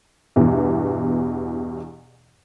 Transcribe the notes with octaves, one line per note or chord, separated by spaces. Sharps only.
E2 G2 B2 E3